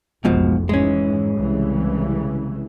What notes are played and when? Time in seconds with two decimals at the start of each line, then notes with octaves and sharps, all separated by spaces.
0.25 F1 B1 G#2 B2 F3
0.69 G#2 E3 G#3 C#4
1.38 C2 C#3 E3